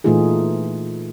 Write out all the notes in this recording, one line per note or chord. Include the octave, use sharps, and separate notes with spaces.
A#2 E3 A3 D#4 F4 G#4